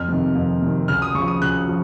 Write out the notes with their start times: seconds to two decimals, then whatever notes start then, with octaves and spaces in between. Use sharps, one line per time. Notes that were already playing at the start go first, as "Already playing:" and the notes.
Already playing: F2 F6
0.08 C3 D#3
0.35 F2
0.62 C3 D#3
0.88 C#2 F6
1.02 D#6
1.15 C#3 C#6
1.19 F3
1.28 D#6
1.41 C#2 F#6
1.68 F3